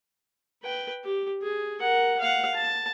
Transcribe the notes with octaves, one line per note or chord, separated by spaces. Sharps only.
B4 G5
G4
G#4
A#4 F#5
F5 F#5
A5